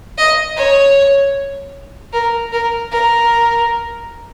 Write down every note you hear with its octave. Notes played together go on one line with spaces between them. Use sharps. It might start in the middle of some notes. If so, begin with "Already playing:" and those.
D#5
C#5
A#4
A#4
A#4